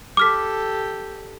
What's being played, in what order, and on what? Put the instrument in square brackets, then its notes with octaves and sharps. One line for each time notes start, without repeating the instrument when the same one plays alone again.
[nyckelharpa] G4 A4 [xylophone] D6 F6 B6